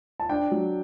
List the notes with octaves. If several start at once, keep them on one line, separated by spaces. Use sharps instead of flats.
A5
D4 G5
F#3